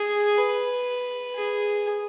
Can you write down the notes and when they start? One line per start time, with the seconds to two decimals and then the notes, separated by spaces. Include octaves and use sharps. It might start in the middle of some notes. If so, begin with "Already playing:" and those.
Already playing: G#4
0.37 B4
1.35 G#4